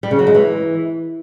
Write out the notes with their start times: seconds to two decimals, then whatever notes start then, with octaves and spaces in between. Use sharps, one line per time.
0.03 G3
0.11 C#3
0.19 F#3
0.27 G#3
0.35 E3